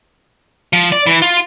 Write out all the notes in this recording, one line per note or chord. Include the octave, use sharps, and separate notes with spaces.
F3
D5
E3
F4